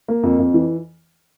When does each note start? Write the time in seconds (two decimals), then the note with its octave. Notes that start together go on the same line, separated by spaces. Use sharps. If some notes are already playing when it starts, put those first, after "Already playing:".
0.08 A#3
0.23 F2
0.39 F2
0.54 E3